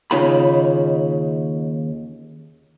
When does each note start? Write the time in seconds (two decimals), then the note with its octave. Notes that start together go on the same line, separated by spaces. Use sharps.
0.11 D#2 C#3 D#4 F4 B5